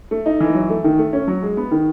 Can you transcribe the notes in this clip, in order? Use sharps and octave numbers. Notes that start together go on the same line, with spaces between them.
A3
D#4
E3
F#3
A3
D#3
A3
C#4
F#3
G#3
B3
D#3